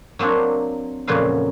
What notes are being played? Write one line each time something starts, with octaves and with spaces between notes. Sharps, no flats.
F#3 A#3 C4 D4 C#5
F2 A#2 C#3 F#3 B4 F5